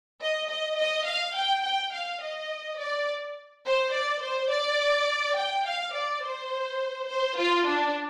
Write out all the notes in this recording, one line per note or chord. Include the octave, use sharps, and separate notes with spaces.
D#5
D#5
D#5
F5
G5
G5
F5
D#5
D5
C5
D5
C5
D5
G5
F5
D5
C5
C5
F4
D4